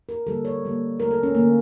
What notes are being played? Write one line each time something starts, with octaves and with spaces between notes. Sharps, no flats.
A#4
D3 G3 A#3 A4
C#5
D3 G3 A#3
D3 A3 A#4
A4
C#4
D3 A3 A#3